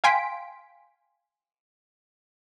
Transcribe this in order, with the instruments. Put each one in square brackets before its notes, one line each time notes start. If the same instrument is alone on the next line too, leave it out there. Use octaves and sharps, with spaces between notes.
[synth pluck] F5 G5 G#5 C6 B6 D7